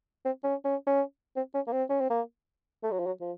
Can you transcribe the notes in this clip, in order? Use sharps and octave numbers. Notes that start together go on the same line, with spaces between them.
C4
C#4
C#4
C#4
C4
C#4
A#3
C4
C#4
C4
A#3
A3
F#3
F3
F#3
F3